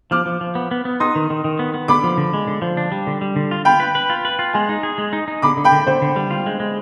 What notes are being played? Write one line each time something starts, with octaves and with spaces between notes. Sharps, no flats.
F3 D6 F6
F3
F3
B3
B3
B3
D#4 C6 D#6
D#3
D#3
D#3
B3
B3
D3 B5 D6
F3
D3
G#3
D3
F3
D4
G3
D3
G3
D3
F4
F4 G5 B5
B4
B4
F4
B4
F4
G#3 G#5 C6
D#4
G#4
G#3
D#4
D#4
D3 B5 D6
D3
G5 B5
D3
D3 C5
D3
G3
F4
G#3
G#3